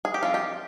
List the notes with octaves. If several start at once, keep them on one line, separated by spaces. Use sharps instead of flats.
G#4
G4
F3 C4 D#4 F4
G4